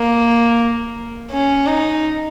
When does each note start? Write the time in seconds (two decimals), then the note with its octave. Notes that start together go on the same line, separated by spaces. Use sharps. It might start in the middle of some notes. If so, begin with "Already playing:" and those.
Already playing: A#3
1.31 C#4
1.67 D#4